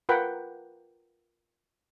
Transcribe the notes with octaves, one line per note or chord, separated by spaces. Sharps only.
F4 A#4 B4 F#5 G5 B5